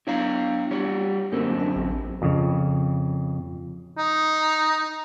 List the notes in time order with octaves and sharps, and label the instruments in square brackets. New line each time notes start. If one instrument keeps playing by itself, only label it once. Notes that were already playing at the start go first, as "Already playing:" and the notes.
[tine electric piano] B3 D4 A#5 [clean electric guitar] E4 C#5 F5
[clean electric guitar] G3 C#5
[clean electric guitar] F#2 D3 C4 [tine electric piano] F#3 A#3 A#4
[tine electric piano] D4
A1
[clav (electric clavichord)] F2 C#3
[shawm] D#4